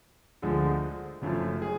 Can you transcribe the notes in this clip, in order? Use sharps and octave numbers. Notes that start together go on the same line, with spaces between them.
D2 D3 F3 G#3
F#1 F#2 F3 A3
G#4